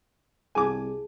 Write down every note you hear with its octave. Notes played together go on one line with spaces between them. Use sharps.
C2 G#4 G#5 A5 D6